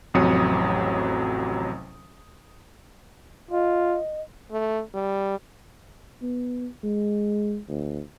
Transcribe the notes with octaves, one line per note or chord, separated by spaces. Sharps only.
A1 F2 C3 F#3 D#6 C#7
F4 D#5
A3
G3
B3
G#3
D2